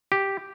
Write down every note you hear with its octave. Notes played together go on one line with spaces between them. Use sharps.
G4